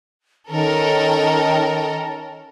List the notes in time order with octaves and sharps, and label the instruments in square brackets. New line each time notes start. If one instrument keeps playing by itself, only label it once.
[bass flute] D#3 [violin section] C#4 A4 A#4